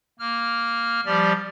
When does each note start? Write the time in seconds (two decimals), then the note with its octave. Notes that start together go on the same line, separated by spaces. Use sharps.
0.19 A#3 F6
1.06 F3 G3 G4 D5